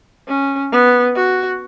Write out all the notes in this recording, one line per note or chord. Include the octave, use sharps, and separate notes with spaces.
C#4
B3
F#4